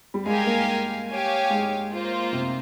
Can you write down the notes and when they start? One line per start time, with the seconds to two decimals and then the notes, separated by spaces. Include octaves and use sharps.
0.14 G3
0.25 G#3 G4 A#4 F5 G#5
0.46 A#3
1.09 G4 C#5 F5 G#5
1.50 G#3
1.91 A#3 F4 C5
2.33 C3